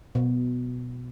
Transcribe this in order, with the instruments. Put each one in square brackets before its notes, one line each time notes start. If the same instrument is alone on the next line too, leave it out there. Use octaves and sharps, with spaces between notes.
[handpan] B2